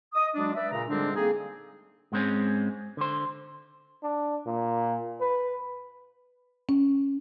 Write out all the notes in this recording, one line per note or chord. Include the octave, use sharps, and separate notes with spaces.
D#5 D#6
F#3 G#3 D4
B4 D5 E5
A#2 C#3 A#5
G#2 D3 G3 G#3 C4 D4
A3 A#3 C4 D#4 G#4
G#2 G#3 C4 C#4
D3 C5
D4
A#2
B4
C#4